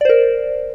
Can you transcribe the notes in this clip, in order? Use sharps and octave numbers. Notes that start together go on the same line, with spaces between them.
A#4 C5 D5